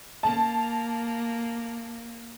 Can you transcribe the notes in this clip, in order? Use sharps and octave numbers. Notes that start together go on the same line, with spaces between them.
A#3 A5